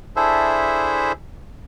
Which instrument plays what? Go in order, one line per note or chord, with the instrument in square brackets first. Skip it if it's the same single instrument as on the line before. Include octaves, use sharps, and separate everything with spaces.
[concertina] D4 E4 G#4 A4 C5 E5